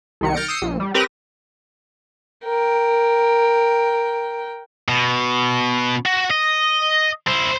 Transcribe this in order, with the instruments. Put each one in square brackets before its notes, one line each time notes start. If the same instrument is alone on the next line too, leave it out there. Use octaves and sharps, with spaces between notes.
[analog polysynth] C2 D#3 C#7
F6 G6 A6 A#6 C#7 D7
D#6 E6 G6 C7 C#7
A#1
G3
C4 G4 A#4 B4 A#6 D#7
[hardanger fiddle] A#4 G5
[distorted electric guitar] B2
F#4
D#5
E4 C5